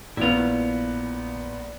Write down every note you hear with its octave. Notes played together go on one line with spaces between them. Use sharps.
A#1 B3 E4 F5